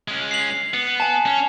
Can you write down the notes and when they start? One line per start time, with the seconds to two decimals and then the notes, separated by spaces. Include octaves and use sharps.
0.08 G#3 C#4
0.31 C7 F7 F#7
0.74 B3 C#7
1.00 G#5 A5
1.26 C#4